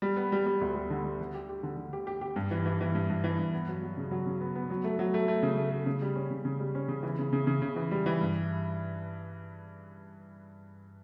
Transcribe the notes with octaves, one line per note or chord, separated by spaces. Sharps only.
G3
B3
G3
G3
D2
G3
D3
G3
D3
G4
G4
D3
D3
G4
G4
G4
G2
E3
E3
E3
G2
G2
E3
G2
B3
F#3
F#3
C#3
F#3
C#3
B3
B3
F#3
A3
F#3
A3
A3
C#3
A3
A3
C#3
G3
C#4
C#3
C#3
G3
C#4
C#3
E3
C#3
C#3
C#3
C#3
E3
G3
E3
G2